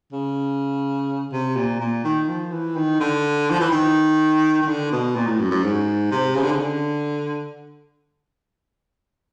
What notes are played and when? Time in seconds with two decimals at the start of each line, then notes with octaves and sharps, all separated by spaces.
0.13 C#3
1.32 C3
1.56 A#2
1.80 A#2
2.04 D#3
2.28 F3
2.52 E3
2.76 D#3
3.00 D3
3.51 F3
3.61 E3
3.72 D#3
4.62 D#3
4.68 D3
4.92 B2
5.16 A#2
5.27 A2
5.39 F#2
5.51 F#2
5.63 G#2
6.11 C3
6.35 C#3
6.43 D3
6.51 C#3
6.59 D3